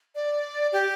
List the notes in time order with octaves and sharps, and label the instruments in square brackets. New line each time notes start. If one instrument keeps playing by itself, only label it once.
[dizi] D5
G4